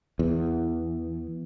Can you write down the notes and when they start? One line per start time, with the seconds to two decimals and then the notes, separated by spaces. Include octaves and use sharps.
0.19 E2